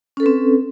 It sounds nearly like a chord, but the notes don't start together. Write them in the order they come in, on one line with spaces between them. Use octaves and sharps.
C#4 A4 B4 C4